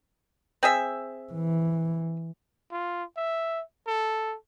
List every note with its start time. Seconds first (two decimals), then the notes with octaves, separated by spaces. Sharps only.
0.63 C4 G#4 E5
1.33 E3
2.72 F4
3.17 E5
3.87 A4